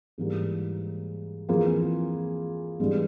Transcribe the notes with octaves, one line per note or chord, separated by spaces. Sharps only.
G#2 E3 G3 A#3
F2 E3 A#3 F4 G#4
G2 E3 G#3